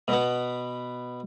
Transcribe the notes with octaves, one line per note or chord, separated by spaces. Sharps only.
B2 B3